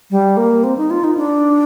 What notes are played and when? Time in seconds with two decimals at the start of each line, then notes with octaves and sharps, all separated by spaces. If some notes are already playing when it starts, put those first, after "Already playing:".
0.11 G3
0.37 A#3
0.64 C4
0.77 D#4
0.90 F4
1.04 D#4
1.17 D4